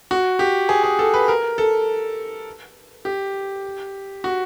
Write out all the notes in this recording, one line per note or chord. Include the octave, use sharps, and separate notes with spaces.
F#4
G4
G#4
G#4
A4
B4
A#4
A4
G4
F#4